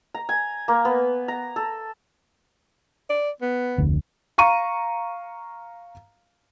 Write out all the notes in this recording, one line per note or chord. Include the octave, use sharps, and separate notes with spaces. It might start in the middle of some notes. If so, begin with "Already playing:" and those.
A#5
G#5
A#3
B3
A#5
A4
D5
B3
F1 D2
F5 A#5 C#6 D#7